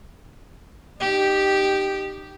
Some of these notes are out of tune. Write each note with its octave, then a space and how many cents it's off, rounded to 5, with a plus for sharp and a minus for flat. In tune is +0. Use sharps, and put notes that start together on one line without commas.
D#4 -30 G4 -5